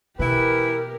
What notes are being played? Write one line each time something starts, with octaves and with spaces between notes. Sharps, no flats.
B2 E3 E4 G4 A#4 B4